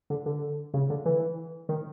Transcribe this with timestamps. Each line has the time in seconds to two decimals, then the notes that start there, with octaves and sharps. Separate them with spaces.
0.10 D3
0.26 D3
0.74 C#3
0.90 D3
1.06 E3
1.69 D#3